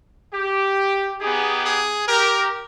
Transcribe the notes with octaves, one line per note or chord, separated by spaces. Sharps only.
G4
B3 D#4 G4 G#4
G#4
G4 A#4